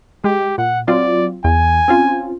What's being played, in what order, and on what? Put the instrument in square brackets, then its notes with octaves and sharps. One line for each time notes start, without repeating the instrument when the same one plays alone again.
[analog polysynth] G#3 [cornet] G4
[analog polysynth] A#2 [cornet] F#5
[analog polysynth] F#3 C4 F4 [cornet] D5
[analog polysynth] E2 [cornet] G#5
[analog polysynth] C4 C#4 F4